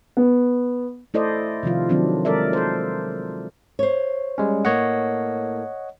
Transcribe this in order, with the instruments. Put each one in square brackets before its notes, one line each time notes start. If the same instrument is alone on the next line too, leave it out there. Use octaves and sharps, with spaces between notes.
[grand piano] B3
[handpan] A3 E4 A4 C5 D5 D#5
C3 D#3 F3 F4
D#3 F#3 C4 D4
G#3 A4 A#4 D5 E5
A4 C5
[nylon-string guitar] C5 C#5
[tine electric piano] G3 G#3 C#4
[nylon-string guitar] A2 A#3 [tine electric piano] C#5 D#5 F#5